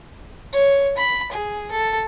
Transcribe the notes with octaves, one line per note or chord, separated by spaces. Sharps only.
C#5
B5
G#4
A4